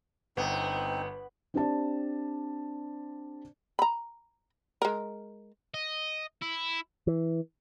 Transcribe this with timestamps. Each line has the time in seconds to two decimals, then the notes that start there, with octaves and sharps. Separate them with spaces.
0.37 G1 B3 C4 D#4
1.54 C4 D4 G4 C5 D5 A5
3.79 A#5 B5
4.82 G#3 A#4
5.74 D#5
6.42 E4
7.07 E3